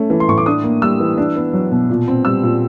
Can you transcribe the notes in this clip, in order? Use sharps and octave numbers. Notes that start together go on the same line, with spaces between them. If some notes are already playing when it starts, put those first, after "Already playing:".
Already playing: A3 C#4
E3
C6
A2 C#6
D6
D4 D#6
A#3
G3 E6
E3
D4
B3
F#3
B2
A#2
C4
G3 E6
A#2